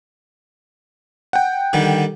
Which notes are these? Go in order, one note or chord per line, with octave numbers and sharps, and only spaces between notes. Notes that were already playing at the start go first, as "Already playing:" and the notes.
F#5 G5
D3 D#3 G3